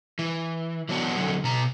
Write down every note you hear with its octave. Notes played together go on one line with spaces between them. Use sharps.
E3
E3 F#3 A3 B3 D4 F#4
F2 A#2 D3 F#3
B2 A#5